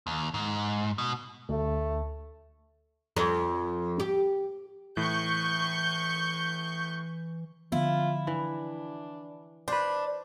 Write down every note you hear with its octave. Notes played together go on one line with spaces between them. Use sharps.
D#2
G#2
B2
D2 A3
F2
G4
A2 E3 C#6 G6
D3 F3 B3 E4 F4
E3 D4
D4 B4 C5